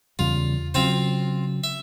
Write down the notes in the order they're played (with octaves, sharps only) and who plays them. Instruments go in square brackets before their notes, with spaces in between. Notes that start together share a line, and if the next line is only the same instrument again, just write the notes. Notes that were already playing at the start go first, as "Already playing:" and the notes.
[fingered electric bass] E2 C#3 G3 [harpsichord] F4
[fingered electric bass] C#3 F#3 [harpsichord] C4 F4 C5
[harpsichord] E5